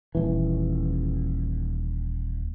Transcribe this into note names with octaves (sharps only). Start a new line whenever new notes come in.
D#1 E3